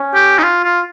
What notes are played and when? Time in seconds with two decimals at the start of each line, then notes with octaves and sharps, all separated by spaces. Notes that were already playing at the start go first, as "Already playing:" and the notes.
Already playing: C#4
0.14 G4
0.38 D#4
0.43 F4
0.64 F4